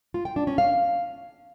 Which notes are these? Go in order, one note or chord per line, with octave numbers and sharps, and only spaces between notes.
F4
G5
D4
C#4
F5